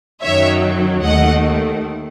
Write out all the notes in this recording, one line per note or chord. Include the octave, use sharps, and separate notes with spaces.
F#2 D#3 F#3 C#5 E5
D#2 D#3 A3 D#5 F#5